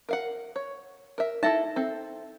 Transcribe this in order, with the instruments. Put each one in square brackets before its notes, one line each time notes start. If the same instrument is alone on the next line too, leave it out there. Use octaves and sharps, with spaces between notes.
[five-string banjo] A#4 F5 F#5
C#5
A#4 E5
[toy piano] D#4 E5 [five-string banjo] E4 A4 A5
[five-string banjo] C4 A4